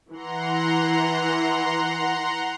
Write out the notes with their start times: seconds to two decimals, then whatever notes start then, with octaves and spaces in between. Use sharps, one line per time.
0.12 E3 F#5 A#5 C6